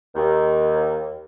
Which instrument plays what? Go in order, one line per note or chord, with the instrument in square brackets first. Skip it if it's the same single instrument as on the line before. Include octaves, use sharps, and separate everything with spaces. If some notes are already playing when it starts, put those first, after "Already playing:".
[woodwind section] D#2